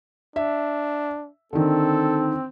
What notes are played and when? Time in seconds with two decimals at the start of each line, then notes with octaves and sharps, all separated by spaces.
0.36 D4 E5
1.53 D3 D#3 C4 A4